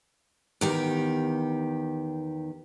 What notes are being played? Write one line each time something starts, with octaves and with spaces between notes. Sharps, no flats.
E2 D#3 G4